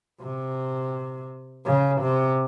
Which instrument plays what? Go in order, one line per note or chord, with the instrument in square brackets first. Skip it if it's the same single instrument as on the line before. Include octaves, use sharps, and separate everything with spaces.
[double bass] C3
C#3
C3